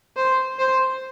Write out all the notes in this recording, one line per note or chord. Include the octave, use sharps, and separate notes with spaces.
C5
C5